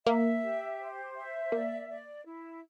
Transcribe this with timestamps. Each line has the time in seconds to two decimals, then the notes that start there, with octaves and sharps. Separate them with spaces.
0.06 A#3 E5
0.43 G4
0.79 C5
1.15 E5
1.52 A#3 D5
1.89 D5
2.25 E4